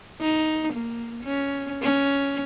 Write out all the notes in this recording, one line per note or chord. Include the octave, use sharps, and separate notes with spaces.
D#4
A#3
C#4
C#4